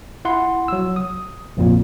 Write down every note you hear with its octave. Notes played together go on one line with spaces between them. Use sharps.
E4 F#5 C6
F#3 E6
D#6
A#1 F2 A#2